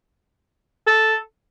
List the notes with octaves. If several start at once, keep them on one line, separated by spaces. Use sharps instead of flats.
A4